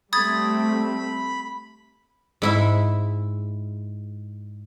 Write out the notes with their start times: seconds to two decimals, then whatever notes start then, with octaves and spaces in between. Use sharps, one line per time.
0.13 G3 A3 C4 B5 D#6 G#6 A6
2.42 G#2 E4 E5